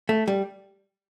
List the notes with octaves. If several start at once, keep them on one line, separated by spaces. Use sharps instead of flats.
A3
G3